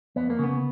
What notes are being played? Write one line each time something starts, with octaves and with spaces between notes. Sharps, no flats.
F2 B3
A#3
C#3 B3